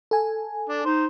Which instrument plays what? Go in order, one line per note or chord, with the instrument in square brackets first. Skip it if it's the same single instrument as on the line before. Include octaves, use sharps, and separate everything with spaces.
[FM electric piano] A4 G#5
[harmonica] D4
[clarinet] D#4 [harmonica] C5